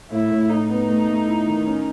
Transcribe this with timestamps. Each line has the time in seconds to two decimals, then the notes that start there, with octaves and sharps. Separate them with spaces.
0.11 A2 E4
0.30 A2
0.49 A2 D#4
0.69 B3
0.88 A3
1.07 A3
1.27 E4
1.46 D#3
1.66 C#4